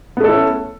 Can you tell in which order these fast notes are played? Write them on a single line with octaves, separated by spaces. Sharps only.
B3 A3 A4 E4 C#4